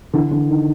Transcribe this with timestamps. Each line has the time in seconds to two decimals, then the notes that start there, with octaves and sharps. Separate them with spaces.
0.14 D3 E3
0.31 D3
0.49 D#3